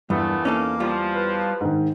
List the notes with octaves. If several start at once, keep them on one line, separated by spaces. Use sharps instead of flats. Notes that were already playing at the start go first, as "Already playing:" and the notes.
E2 G2 A#2 E3 A3 B3
A#3 C#4 D#4 A4
F3 G3 F4
B4
G#2 D#3